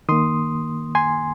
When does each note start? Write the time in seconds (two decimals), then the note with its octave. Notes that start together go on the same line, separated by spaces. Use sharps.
0.09 D#3 A#3 C6 D#6
0.95 G#5 C6